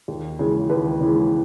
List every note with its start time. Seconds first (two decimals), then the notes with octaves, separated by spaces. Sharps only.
0.08 D#2
0.39 C#3 E3 G#3
0.70 D#2 B4
1.00 C#3 E3 G#3